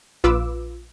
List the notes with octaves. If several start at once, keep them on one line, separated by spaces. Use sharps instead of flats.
A#1 F4 B4 D6 E6